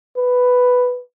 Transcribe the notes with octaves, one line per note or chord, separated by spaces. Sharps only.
B4